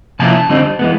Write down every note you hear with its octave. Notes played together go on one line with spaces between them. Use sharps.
C3 F3 A#3 C#4 E4 A5
D3 G3 C4 D#4
E3 G#3 B3